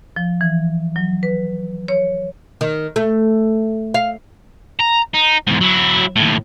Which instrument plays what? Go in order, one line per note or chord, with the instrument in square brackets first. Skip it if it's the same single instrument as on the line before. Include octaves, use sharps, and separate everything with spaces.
[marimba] F3
E3
F#3
B4
C#5
[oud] D#3
A3
F5
[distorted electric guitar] A#5
D#4
E2 G#2
F#3 E4
D#2 A2